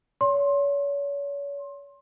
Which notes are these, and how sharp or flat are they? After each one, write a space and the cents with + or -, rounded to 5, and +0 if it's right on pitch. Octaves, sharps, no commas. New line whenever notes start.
C#5 +35 C6 +25